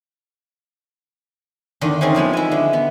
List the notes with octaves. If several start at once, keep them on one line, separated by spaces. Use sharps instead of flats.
E2 D3 D#3 D#5
C4 C#4 G#4 A#4
D3 F3 G#3 B3
E4 G#5
D3
B3